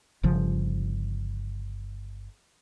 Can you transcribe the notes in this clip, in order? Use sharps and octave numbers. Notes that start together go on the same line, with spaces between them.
G1 C#3 F3